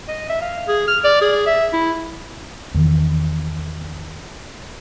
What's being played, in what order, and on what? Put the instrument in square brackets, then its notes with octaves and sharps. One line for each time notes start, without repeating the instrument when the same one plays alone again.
[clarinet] D#5
E5
F5
G#4
F6
D5
G#4
E5
E4
[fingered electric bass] E2 D#3